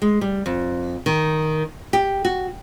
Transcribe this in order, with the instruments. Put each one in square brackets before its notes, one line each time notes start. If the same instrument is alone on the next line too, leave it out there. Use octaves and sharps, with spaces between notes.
[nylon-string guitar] G#3
G3
F2
D#3
G4
F#4